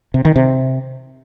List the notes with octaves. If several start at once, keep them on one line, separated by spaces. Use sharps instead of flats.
C3
D#3
C3